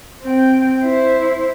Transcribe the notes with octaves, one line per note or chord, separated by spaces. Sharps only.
C4 G5
E4 C5